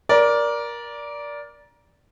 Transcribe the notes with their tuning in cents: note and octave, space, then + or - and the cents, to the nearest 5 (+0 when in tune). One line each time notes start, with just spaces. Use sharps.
A#4 +20 D5 -10